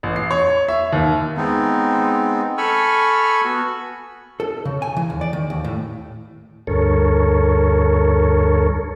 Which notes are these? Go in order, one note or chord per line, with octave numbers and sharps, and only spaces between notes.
A1
C7
C#5
E5
D#2
G#3 B3 C4 D#4
A4 G#5 B5 C#6 E6 F6
B3 F#4
A4
C#3
G#5
E3
D#2
D5
D#3
D#2
A2
D2 G2 A4 A#4 C#5